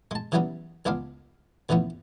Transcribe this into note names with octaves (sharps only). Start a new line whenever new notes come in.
G#3 A5
C3 E3 F#3 G3 B3 C#4
C#2 G#3 B3 D4 F5
D2 E3 F3 B3 C#4